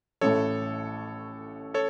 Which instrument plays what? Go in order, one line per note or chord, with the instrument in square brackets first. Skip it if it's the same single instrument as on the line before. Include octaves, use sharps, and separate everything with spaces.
[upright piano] A1 A2 A3 [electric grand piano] A4 C#5
[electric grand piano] A4 C#5